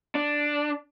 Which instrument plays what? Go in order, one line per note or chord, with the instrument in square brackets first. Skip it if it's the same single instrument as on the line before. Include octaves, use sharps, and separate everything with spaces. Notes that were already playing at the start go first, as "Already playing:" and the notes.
[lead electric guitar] D4